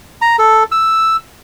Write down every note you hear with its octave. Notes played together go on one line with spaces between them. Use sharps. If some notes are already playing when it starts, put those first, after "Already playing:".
A#5
A4
E6